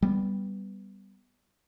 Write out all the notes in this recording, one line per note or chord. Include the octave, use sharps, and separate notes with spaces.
G3 B3